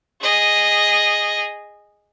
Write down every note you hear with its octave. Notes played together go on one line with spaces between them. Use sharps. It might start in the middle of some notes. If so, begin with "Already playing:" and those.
G#4 D#5